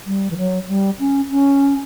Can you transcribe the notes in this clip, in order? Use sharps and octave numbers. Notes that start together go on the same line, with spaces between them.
G3
E3
F#3
G3
C#4
C#4